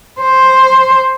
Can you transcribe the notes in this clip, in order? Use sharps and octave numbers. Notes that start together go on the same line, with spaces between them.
C5